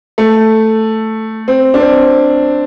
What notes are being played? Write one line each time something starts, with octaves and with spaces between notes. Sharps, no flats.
A3
C4
D4
C4